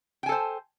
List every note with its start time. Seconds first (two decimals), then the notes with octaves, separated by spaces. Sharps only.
0.23 G5
0.26 G#5
0.29 A4
0.32 C5